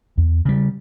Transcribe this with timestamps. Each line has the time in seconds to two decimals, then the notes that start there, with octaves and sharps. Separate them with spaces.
0.18 E2
0.45 C#3 G3